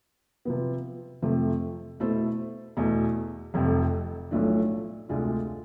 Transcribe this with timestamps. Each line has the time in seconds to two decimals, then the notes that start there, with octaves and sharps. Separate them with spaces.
0.45 C3 F3 B3
1.22 F2 C3 F3 A3 C4
2.00 B2 A3 E4 A4 C5
2.77 E2 B2 A3
3.54 F1 F2 C3
4.31 B1 A2 F3 A3 D4
5.09 D2 C3 G#3 D4 F4